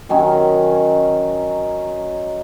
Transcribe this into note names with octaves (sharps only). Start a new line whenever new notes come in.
D#3 F#3 C#4 D#4